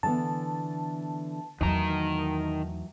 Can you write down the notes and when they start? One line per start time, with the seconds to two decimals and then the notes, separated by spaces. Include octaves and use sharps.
0.03 D3 E3 B3 A5
1.61 E2 D#3 E3 F#3 A3 A#5